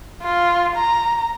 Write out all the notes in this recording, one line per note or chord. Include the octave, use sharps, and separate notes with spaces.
F4
A#5